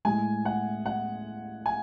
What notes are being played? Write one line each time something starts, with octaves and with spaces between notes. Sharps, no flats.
A2 G#3 G#5
F#5
F#5
G#5